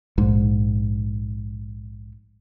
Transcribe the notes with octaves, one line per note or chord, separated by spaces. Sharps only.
A#1 G#2